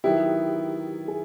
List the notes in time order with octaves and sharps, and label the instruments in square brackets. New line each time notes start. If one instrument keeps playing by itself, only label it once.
[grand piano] D#3 F#3 B3 E4 [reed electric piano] G4
[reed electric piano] G#4